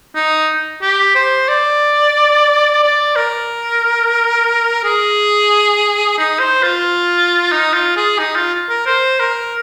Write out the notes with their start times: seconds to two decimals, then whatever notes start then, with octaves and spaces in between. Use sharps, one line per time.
0.15 D#4
0.82 G4
1.15 C5
1.49 D5
2.83 D5
3.16 A#4
4.84 G#4
6.18 D#4
6.40 C5
6.63 F4
7.52 D#4
7.74 F4
7.97 G#4
8.19 D#4
8.36 F4
8.70 A#4
8.86 C5
9.20 A#4